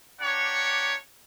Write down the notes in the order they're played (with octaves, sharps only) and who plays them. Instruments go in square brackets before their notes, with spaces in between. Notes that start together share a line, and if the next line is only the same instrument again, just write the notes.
[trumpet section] A#3 D4 G4 C#5 F#5